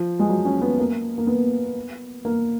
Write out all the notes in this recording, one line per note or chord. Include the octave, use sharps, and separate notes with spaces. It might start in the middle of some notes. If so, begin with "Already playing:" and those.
Already playing: F3
G#3
F#3
C#4
B3
A#3
A#3
B3
A#3